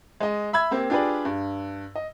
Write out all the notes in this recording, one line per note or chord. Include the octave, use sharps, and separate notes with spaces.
G#3 D#5
E5 B5 E6 G#6
A#3 C4 G4
D4 F4 G4 G#4 B4 D5
G2
D#5